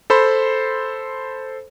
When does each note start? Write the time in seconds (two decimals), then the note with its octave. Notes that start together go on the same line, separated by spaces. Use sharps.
0.10 A4 C5 B5 C6